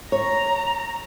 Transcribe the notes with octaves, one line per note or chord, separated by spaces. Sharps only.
C#5 A#5